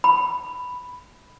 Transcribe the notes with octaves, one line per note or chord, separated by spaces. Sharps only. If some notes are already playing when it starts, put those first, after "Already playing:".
B5